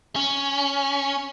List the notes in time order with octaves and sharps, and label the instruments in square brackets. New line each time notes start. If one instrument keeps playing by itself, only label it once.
[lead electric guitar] C#4